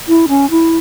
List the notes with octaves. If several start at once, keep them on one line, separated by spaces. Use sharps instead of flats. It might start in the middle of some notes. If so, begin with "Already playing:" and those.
E4
C#4
E4